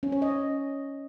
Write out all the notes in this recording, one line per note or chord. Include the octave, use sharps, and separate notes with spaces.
C#4
C#5
D#5